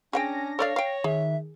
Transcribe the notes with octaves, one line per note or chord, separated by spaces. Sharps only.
C#4 D4 G#4 F#5 G5 A#6
A4 C#5 D5 F5
F5 G5
D#3 G#4 E5